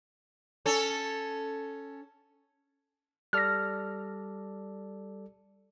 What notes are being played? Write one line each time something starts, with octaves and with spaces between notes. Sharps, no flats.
C#4 A4
G3 A4 D5 F6 A#6